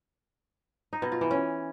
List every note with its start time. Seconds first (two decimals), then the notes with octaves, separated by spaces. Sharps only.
0.93 D#4
1.02 B2
1.12 F4
1.21 E3
1.31 C#4